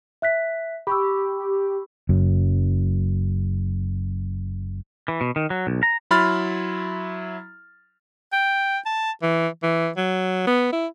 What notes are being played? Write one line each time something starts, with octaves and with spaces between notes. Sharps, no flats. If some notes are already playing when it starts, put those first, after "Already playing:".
E5 F#6 B6
G4 B5 C#6 E6
F#1 F#2
E3
B2
D#3
F#3
B1
A#5
F#3 E4 B5 C6 F6 A6
G5
A5
E3
E3
F#3
B3
E4